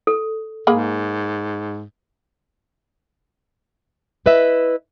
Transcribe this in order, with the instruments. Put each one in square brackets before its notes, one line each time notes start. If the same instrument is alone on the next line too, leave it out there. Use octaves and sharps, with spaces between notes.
[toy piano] A4
[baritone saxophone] G#2 [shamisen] A#3 G#4 B5
[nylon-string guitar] E4 B4 D#5 E5